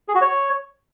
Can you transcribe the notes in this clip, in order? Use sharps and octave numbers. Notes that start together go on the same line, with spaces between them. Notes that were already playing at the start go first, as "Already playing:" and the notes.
G#4
F#4
C#5